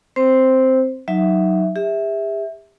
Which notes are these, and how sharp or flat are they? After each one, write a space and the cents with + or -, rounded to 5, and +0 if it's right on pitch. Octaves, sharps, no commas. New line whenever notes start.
C4 -5 C5 +0
F#3 +0 D#4 +0 E5 +0
G4 +45 E5 -10